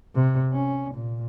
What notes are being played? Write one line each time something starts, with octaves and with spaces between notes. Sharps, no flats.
C3
C#4
A#2